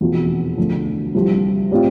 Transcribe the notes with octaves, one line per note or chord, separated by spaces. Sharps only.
F1 E2 B2 B3 F4
D2 D3 F3
C2 C3 F3
A2 G3 C4 F4